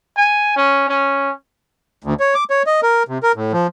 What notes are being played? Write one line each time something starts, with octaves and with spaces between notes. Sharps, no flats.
G#5
C#4
C#4
D2
C#5
D6
C#5
D#5
A#4
C3
A#4
A2
F3